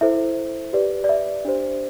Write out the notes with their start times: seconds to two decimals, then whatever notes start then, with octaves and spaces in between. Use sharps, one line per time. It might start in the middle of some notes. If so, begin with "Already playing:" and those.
0.01 E4 A4 C5 E5
0.73 G4 B4 D5
1.04 D5
1.09 E5
1.45 D4 G4 C5